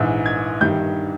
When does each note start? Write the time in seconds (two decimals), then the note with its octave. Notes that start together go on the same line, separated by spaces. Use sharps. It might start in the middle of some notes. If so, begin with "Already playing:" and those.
Already playing: A#1 G#2 E3 E6
0.26 G#6
0.61 G1 G2 D#3 G3 G6